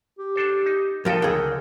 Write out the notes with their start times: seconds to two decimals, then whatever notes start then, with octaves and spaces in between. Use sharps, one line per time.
0.19 G4
0.36 D4 A4 C5
0.66 D#4
1.05 F2 F3 A4 A#4 D#5 G5
1.22 C#2 D3 G#4 G5